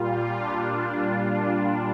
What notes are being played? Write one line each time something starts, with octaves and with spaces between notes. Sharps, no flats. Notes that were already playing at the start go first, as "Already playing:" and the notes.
Already playing: A#2 G3 F4
D4
F4
D4